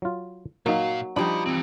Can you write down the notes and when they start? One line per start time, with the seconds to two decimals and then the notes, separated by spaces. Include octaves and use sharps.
0.02 F#3 F4
0.66 A#2 F#3 A#3 D#4 F5
1.16 F3 G3 D4 D#4 F#4 B5
1.46 E3 C4